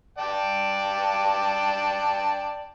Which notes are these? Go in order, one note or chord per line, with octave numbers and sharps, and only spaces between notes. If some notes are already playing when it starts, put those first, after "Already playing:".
D5 G5 A5